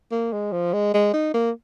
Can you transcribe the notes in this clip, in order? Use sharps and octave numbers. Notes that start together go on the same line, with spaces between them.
A#3
G#3
F3
G#3
G#3
D#4
A#3